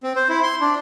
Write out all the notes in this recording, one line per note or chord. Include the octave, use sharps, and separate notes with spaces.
C4
C5
E4
C6
D4